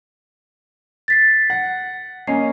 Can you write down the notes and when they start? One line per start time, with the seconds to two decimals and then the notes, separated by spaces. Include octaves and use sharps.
1.08 A6 B6 C7
1.50 F#5
2.27 A#3 C#4 D#5 G#5 C7